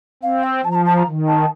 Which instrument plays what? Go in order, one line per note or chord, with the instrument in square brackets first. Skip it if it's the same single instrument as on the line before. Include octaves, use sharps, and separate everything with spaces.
[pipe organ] C4 [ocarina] F5
[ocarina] G5
[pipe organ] F3 [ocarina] A5
[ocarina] A#5
A5
A5
A#5
[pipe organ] D#3
[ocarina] A5